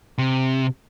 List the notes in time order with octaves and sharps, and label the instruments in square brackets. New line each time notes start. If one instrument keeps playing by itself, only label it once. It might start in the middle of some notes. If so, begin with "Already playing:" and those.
[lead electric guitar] C3